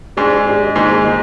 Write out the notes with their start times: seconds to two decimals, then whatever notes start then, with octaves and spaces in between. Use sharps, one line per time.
0.17 G#2 G#3 D4 G#4
0.46 G#3 D4 G#4
0.76 G#2 D#3 A#3 D#4 G#4
1.04 D#3 A#3 D#4 G#4